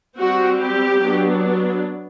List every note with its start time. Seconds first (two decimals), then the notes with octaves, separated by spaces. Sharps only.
0.17 G3 C4 F#4
0.58 G4
0.99 F#3 B3 D4